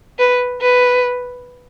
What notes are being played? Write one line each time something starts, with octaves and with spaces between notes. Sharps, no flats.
B4
B4